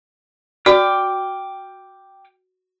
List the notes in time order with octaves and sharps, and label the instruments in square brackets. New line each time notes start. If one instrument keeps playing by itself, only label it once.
[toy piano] F#4 [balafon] D5 [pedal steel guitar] G5 D6 F6